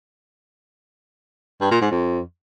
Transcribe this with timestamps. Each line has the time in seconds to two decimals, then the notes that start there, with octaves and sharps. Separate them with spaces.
1.61 G2
1.71 A#2
1.81 G#2
1.91 F2